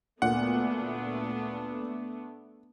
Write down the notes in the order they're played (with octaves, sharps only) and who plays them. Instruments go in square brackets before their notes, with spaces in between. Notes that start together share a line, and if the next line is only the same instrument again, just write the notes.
[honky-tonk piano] D2 A#2 [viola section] A3 B3 D4 [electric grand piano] F#5